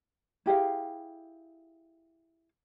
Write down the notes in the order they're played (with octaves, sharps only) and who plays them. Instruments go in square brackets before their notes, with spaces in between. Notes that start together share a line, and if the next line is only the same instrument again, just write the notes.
[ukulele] E4 G4 G#4 F5